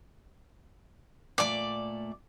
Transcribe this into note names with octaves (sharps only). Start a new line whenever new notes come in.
A#2 A3 D5 D6